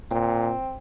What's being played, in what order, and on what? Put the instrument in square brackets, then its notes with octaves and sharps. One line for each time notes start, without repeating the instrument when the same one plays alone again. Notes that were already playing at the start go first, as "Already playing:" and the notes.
[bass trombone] A#2 [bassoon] C4